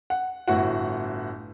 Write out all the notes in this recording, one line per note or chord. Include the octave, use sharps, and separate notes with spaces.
F#5
G1 A2 E4 F#4 F#5